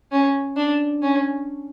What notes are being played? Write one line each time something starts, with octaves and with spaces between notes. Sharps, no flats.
C#4
D4
C#4